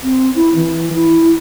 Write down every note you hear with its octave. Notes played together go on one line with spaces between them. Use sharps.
C4
E4
E3
E4